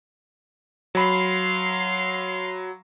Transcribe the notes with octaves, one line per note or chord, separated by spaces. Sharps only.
F#3 F5 B5 C6